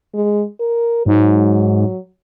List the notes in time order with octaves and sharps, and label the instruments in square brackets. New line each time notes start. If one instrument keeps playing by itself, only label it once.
[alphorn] G#3
A#4
[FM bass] G#2 [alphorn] F#3